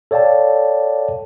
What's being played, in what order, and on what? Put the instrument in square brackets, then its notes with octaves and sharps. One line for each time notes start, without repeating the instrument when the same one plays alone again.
[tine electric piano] A4 C#5 D5 F5 G5 A5